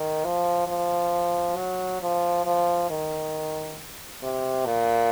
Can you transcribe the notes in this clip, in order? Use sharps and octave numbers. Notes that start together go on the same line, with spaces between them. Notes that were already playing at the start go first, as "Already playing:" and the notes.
Already playing: D#3
F3
F3
F#3
F3
F3
D#3
C3
A#2